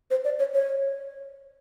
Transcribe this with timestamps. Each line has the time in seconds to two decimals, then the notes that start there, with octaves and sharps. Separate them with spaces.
0.11 C5
0.25 D5
0.39 C#5
0.54 C#5